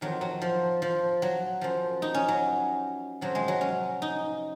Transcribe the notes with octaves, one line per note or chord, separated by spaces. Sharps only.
F2 D#3 F#3
F#3
F3
F3
F#3
F#2 F3
D#4
C#4
F#3
F2 C3 F3 F#3
G#3
F#3
C#4
D#4